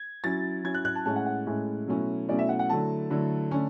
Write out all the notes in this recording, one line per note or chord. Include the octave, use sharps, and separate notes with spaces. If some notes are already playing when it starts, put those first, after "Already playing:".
Already playing: G#6
F#3 C#4 E4 A6
F#3 C#4 E4 G#6
F#6
F#6
A5
A2 G#3 C#4 E4 A5
F#5
F#5
A2 G#3 C#4 E4
B2 F#3 A3 C#4 E4
B2 F#3 A3 C#4 E4 D5
E5
F#5
F#5
D3 F#3 A3 E4 A5
D3 F#3 A3 E4
D3 A3 C#4